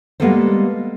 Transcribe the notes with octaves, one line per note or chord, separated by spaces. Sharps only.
G3 G#3 A#3 B3 A4 C5